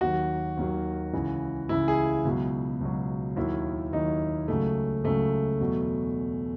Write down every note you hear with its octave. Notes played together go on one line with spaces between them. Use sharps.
D#2 D#3 F#3 F#4
D#2 D#3 F#3
C#2 C#3 E3
C#2 C#3 E3 E4
G#4
C#2 B2 F#3
C#2 B2 F#3
D#2 D#3 F#3 E4
D#2 D#3 F#3 D#4
C#2 C#3 F#3 A3
C#2 C#3 F#3 A3
E2 B2 F#3